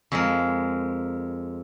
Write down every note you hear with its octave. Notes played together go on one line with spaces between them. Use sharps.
F2 G#3 A#4